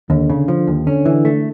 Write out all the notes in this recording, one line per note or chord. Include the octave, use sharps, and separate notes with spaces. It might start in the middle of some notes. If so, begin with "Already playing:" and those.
D#2 D3
C#3
F3
D#2
D3 C#4
E3
A3